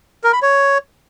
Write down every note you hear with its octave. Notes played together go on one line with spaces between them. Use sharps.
A#4
B5
C#5